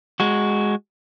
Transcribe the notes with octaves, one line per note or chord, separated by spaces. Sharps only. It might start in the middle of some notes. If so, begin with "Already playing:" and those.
G#3 F#4